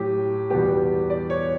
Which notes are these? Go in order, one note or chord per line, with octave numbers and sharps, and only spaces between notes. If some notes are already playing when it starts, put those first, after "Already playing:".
Already playing: A2 F#3 G4
E2 B2 G3 B3 G4
D5
C#5